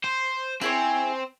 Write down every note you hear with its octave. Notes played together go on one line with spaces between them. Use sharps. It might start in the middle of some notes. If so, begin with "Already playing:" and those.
C5
C4 E4 G#4 C#5